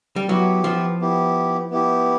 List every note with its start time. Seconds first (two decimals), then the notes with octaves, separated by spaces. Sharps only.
0.16 G3
0.29 F#3 B3 E4 G4
0.64 F3
1.00 B3 E4 G4
1.71 B3 E4 G4